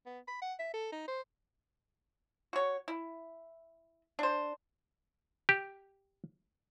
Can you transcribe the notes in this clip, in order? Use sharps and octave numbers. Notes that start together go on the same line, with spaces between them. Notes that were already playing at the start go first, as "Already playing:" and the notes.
B3
B5
F#5
E5
A4
D#4
C5
F#4 C#5
E4
D4 C5
G4